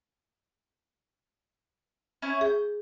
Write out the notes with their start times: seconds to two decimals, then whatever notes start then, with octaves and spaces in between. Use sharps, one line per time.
2.22 C#4 E4 C#5
2.41 G#4 G6